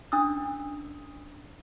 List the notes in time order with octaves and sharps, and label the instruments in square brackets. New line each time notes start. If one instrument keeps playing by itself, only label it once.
[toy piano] C#4 D4 E4 D#6 E6